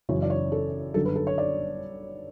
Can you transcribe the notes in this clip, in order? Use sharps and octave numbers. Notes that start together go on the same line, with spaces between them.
F#1 F#2 C#3 E3 C#5
D5
C#5
A4
G1 F#2 D3 F#3 A4
B4
A4
C#5
D5